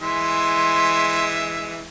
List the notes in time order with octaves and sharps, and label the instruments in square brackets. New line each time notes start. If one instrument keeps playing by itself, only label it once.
[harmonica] E3 G#3 E5 [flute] C6